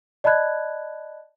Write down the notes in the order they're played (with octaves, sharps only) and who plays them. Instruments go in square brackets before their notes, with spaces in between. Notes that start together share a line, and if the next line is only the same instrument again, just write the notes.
[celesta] D5 D#5 A5 B5 F#6 G#6